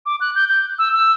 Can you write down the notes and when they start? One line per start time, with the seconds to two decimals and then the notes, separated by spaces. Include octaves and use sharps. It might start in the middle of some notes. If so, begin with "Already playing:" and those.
0.06 D6
0.21 F#6
0.35 G6
0.49 G6
0.79 E6
0.93 E6